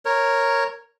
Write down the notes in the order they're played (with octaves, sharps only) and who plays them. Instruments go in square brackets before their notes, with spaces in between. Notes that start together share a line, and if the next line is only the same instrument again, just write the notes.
[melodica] A#4 C#5